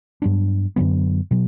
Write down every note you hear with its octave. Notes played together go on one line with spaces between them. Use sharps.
G2 F#3 B3 D4
F#2 D3 F#3 B3
B2 F#3